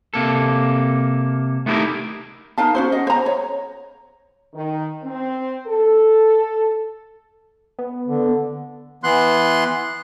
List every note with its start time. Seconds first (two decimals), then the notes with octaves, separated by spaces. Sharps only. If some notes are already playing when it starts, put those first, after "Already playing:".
0.14 C3 A#3 A4
1.66 A3 B3 D#4 E4 G4 A#4
2.58 D#4 A#4 F5 A5
2.75 C#4 F#4 C5
2.92 D#5 F#5
3.07 C5 A#5
3.26 C#5
4.54 D#3
5.03 C4
5.66 A4
7.79 B3
8.08 D3
9.04 E3 B3 C6 F#6